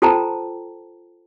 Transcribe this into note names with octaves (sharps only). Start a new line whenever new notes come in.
F4 A4 C5 G5 A5 A#5